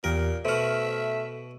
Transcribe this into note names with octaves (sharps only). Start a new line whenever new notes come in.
E2 A#2 G4 A#4
B2 A3 F#4 C5 E5 F6